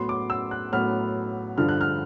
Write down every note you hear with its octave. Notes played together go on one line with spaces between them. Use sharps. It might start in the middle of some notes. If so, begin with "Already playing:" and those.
Already playing: A2 F#3 B3 C6
D6
E6
F#6
A2 F#3 B3 F6
G2 D3 F3 F6
F#6
F6